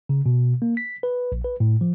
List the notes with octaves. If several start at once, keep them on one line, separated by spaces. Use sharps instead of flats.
C#3
B2
A#3
B6
B4
A#1
B4
A2
F3